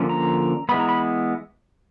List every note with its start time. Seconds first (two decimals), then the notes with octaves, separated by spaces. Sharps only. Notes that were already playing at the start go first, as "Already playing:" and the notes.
Already playing: D3 F3 A#3 C#4
0.09 A#5
0.69 E3 G#3 B3 B5
0.80 A#5
0.89 B5